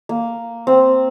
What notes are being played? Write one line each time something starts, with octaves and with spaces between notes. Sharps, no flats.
A#3
C4